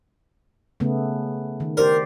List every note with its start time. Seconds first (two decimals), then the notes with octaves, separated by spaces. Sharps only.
0.80 C#3 A3 B3
1.60 D#3
1.77 G4 A#4 C5 D5